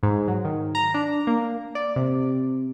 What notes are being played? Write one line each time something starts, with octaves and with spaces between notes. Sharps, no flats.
G#2
F#3
D#3
A#5
D4
A#3
D5
C3